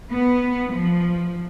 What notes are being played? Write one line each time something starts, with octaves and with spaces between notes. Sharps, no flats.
B3
F3